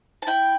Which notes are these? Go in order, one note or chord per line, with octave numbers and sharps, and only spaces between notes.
A5
E4 G5